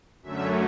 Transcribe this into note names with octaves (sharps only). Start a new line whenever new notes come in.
F#2 D3 F#3 A3 C#4 E5